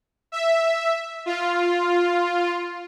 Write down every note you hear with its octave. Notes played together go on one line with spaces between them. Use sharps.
E5
F4